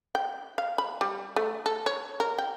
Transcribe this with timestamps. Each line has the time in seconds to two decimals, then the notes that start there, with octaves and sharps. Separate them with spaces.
0.15 G5
0.58 F5
0.78 B5
1.01 G3
1.36 A3
1.66 A4
1.86 C#5
2.20 A#4
2.38 G5